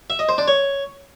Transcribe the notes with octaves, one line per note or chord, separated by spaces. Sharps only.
E5
D#5
C5
D4
C#5